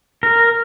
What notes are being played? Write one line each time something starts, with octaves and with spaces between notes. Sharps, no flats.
A#4